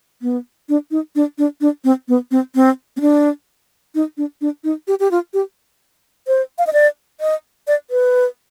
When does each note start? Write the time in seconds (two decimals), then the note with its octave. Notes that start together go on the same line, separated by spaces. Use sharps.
0.22 B3
0.69 D4
0.91 D#4
1.16 D4
1.38 D4
1.61 D4
1.84 C4
2.08 B3
2.31 C4
2.55 C4
2.97 C4
3.01 D4
3.95 D#4
4.17 D4
4.41 D4
4.64 D#4
4.88 G4
5.00 G4
5.11 F4
5.34 G4
6.28 C5
6.58 F5
6.67 D#5
6.73 D5
7.20 D#5
7.67 D5
7.91 B4